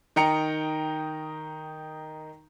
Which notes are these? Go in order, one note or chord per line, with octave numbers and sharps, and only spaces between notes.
D#3 D#4 G5 A#5 C#7